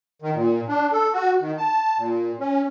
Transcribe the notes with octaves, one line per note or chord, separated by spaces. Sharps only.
D#3
A#2
D4
A4
F#4
D#3
A5
A#2
C#4